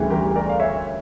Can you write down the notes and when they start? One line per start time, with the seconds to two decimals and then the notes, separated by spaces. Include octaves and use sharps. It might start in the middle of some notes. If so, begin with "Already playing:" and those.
Already playing: D2 C#3 E3 G3
0.10 G4 A#4
0.36 A#4 D5
0.49 F5
0.60 C#5 E5